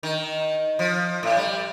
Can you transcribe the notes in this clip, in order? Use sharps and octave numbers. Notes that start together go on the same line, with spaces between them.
D#3
F3
A2
G3